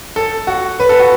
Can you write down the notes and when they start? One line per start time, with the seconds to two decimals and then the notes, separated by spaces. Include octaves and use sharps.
0.16 A4
0.47 F#4
0.80 B4
0.89 A4
1.00 F#4